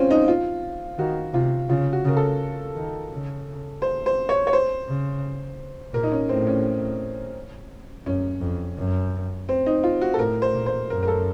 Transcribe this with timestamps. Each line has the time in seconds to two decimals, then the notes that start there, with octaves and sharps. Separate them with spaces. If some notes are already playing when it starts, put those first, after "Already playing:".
Already playing: C4 C#4 F4
0.11 D#4
0.28 F4
0.99 D#3 F#4
1.34 C3 F4
1.69 C#3 F4
1.93 F#4
2.05 C#3 A#4
2.17 A4
2.76 D#3
3.12 C#3
3.82 C5
4.06 C5
4.29 C#5
4.47 C#5
4.53 C5
4.88 C#3
5.94 A#2 A#4
6.03 D#4
6.12 C#4
6.29 A2 C4
6.47 C#4
8.06 F#2 C#4
8.41 F2
8.78 F#2
9.49 C4
9.66 D#4
9.84 F4
10.01 F#4
10.14 A4
10.19 A2 A#4
10.42 C5
10.54 A#2
10.66 C5
10.89 F#2 A#4
11.03 A#4
11.08 A4